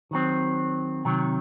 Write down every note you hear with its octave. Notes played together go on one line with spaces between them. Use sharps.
D#3 F#3 C4
C3 D#3 F#3